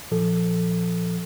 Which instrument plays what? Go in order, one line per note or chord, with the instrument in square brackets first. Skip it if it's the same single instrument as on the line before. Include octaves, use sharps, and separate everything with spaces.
[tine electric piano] A#2 F3 A4